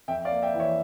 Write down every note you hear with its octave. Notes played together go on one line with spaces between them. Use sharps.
F2 E5 G5
D5 F5
A#3
E5 G5
E3
C#5 E5